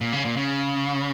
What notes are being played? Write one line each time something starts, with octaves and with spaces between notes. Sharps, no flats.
A#2
C#3
A#2
C#3